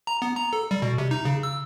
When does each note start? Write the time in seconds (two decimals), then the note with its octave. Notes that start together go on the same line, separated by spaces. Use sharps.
0.07 A#5
0.22 B3
0.36 A#5
0.53 A4
0.71 G3
0.82 B2
0.98 C3
1.11 D#4
1.25 C#3
1.43 E6